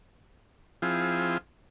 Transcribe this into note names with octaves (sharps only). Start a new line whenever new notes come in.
F3 C4 E4 F4 G#4